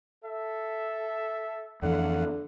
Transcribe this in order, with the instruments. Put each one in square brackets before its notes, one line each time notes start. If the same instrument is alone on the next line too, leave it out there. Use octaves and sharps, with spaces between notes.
[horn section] A4 E5
[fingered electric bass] F2 E3 [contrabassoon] D3 [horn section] A3 F5 F#5